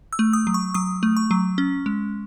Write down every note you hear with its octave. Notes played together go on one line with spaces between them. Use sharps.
E6
A3
D#6
F#3
C#6
F#3 D#6
A3
C#6
F#3
C#4
G#3